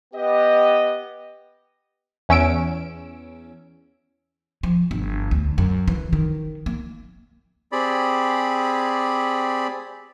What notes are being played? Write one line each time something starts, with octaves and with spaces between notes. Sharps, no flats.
B3 G4 D#5
E2 C#4 E6 D7
F3
G1
D2
F#2
E3
D#3
A#3
C4 G4 G#4 D5 B5